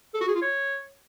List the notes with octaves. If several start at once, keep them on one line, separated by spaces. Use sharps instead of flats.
A4
F#4
G#4
F4
C#5